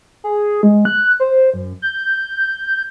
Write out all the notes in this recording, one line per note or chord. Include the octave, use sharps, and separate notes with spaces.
G#4
G#3
F#6
C5
F#2
G6